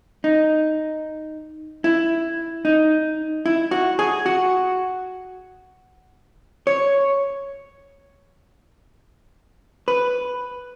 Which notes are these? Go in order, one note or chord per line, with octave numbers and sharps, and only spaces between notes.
D#4
E4
D#4
E4
F#4
G#4
F#4
C#5
B4